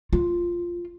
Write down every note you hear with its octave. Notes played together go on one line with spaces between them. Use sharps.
F4